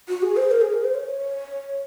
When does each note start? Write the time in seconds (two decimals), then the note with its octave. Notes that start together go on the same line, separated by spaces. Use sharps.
0.09 F#4
0.23 G#4
0.37 C5
0.51 A#4
0.61 G#4
0.73 A#4
0.84 C5
0.94 C#5